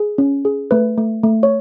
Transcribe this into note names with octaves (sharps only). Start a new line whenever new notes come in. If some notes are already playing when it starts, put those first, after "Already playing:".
Already playing: G#4
C#4
G#4
A3 B4
A3
A3
C#5